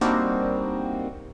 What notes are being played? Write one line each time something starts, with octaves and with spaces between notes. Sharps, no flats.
G3 A#3 C4 D4 D#4 F#4